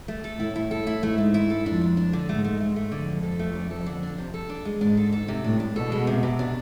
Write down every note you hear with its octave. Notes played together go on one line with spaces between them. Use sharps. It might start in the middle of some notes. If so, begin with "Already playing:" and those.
A3
A4
A2 E4
E4
A4
E4
G#2 A3
A3
E4
A4
F2 D4
D4
D4
D3
G#2 A3
A3
A3
A3
F2 D3
D4
A4
A3
D4
A4
D3
D4
C3
A4
D4
G#3
G#2 D4
A4
A4
C3
A2 D4
D4
B2 A4
G#3
C3
C3
D4